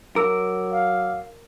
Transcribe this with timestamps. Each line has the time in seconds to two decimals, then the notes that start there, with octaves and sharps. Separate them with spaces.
0.16 F#3 A#4 D6 E6
0.71 F5